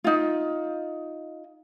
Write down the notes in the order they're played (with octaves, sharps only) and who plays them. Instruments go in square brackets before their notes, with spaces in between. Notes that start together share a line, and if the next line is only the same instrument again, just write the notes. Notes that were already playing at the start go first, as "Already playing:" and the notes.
[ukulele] D#4 F4